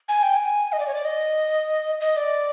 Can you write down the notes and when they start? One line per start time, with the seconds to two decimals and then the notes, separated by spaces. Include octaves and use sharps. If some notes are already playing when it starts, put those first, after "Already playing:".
0.09 G#5
0.23 G5
0.37 G#5
0.73 D#5
0.79 D5
0.88 C#5
0.95 D5
1.05 D#5
2.01 D#5
2.17 D5